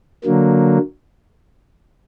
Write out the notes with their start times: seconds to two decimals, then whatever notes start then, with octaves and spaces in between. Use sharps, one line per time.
0.25 D3 F#3 A#3